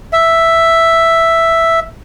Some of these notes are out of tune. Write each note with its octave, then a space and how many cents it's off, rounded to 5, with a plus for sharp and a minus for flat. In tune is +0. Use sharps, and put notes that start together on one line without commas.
E5 +5